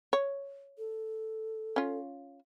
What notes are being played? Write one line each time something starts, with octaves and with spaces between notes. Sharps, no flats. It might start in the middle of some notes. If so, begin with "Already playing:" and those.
C#5
A4
C#4 F4